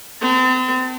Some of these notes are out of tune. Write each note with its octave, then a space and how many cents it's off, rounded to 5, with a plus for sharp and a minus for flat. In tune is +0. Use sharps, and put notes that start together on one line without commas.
C4 -40 A5 +35